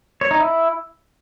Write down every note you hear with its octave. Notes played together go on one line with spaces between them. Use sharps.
C#5
D#4
E4